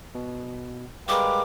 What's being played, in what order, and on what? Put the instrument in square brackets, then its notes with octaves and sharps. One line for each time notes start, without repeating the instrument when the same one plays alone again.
[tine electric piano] B2
[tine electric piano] G3 G#3 A#4 [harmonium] B4 F5 G5 [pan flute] D6